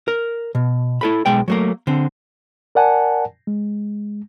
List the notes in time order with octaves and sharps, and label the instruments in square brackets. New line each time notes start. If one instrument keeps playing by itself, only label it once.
[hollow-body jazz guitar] A#4
B2
E4 A4 B5
B1 G#3 G5
F#3 A3 A#3
D3 C4
[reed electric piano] A#4 D5 F#5 G#5 A5
G#3